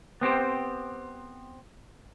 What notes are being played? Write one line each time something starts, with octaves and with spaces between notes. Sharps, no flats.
B3 C4 G4 C5